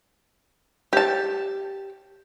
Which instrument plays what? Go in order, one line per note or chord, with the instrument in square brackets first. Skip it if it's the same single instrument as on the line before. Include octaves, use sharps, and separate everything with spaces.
[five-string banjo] G4 A5